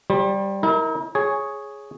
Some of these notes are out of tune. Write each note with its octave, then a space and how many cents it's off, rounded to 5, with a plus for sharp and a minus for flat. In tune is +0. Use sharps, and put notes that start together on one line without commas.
G3 +0 C5 +40
E4 -45 A#4 +0
G#4 +0 C#5 +0